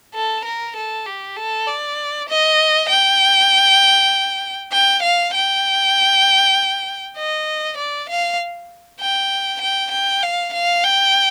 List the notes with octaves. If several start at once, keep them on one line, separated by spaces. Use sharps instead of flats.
A4
A#4
A4
G4
A4
D5
D#5
G5
G5
F5
G5
D#5
D5
F5
G5
G5
G5
F5
F5
G5